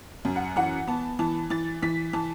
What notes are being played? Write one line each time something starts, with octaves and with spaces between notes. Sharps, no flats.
F#2
F#5
E3 F#5
B3 A5
E3 A5
E3 A6
E3 B6
E3 A5